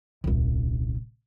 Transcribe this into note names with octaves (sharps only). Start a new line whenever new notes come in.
D#1 C2